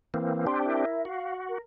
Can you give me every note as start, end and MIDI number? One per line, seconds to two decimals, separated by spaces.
0.14 0.46 52
0.14 0.46 58
0.14 0.46 60
0.47 0.85 60
0.47 0.85 62
0.47 0.85 67
0.47 0.58 84
0.64 1.03 64
0.64 1.03 70
0.64 1.03 76
1.05 1.58 66
1.05 1.33 77
1.48 1.60 70